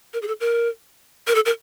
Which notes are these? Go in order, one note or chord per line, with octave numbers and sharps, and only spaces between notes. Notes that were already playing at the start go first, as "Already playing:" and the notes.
A#4
G#4
A4
A#4
A#4
A4
A#4